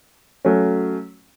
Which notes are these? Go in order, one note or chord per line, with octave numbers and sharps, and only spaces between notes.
F#3 A3 C#4